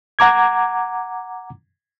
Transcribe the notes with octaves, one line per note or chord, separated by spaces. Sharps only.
F#5 A#5 D6 G#6